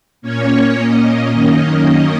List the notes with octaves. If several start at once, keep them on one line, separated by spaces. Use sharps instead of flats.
A#2 A#3 C#4 C#5
D#5
F#2 D#3 A#3 C#4
D#5